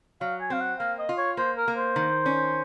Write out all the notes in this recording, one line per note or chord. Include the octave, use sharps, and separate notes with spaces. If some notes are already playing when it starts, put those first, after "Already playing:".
F#3 F5
G#5
C4 F5
F#5
A#3 F5
D#5
F4
C#5
A#3 C5
A#4
A#3
C5
D#3
C#4